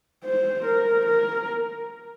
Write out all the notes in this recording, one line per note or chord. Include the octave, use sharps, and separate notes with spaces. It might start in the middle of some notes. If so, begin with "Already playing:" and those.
C5
A#4
A#4